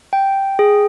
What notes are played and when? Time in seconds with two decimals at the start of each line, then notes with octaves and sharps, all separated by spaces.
0.13 G5
0.59 G#4